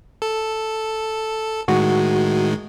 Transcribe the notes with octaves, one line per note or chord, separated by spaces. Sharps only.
A4
A2 D#3 G#3 F#4